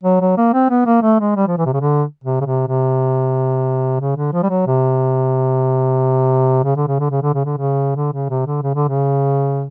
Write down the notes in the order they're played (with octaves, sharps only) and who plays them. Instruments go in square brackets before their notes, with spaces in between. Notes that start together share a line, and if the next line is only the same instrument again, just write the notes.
[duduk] F#3
F#3
A#3
C4
B3
A#3
A3
G#3
G3
F3
E3
C3
C#3
D3
C3
C#3
C3
C3
C#3
D3
F3
G3
F#3
C3
C#3
D3
C#3
D3
C#3
D3
C#3
D3
C#3
D3
C#3
C3
D3
C#3
D3
C#3